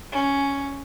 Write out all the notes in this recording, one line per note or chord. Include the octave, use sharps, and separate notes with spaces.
C#4